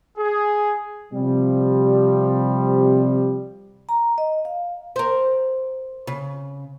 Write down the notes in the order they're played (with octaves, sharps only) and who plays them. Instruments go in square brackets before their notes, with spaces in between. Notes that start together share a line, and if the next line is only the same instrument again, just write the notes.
[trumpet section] G#4
[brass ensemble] C3 F3 G3
[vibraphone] A#5
D#5
F5
[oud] A#4 C5
C#3